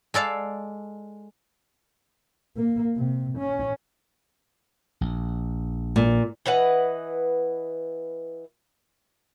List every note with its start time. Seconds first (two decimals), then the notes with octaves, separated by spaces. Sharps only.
0.14 G#3 A4 D5 F5
2.57 A#3
2.96 C3
3.38 C#4
5.01 A#1
5.96 A#2
6.46 E3 B4 D#5 F#5